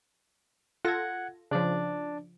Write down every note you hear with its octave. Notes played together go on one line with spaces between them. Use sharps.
F4 A4 F#5 G#6 A#6
C#3 F3 D4 D5